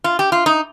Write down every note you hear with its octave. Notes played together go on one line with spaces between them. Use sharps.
F4
G4
F4
D#4